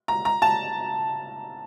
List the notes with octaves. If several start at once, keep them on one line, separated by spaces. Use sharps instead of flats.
A#5
A#5
A5